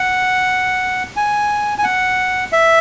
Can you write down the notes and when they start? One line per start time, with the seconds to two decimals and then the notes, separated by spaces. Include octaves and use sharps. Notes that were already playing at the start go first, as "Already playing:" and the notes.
Already playing: F#5
1.16 G#5
1.78 G#5
1.84 F#5
2.52 E5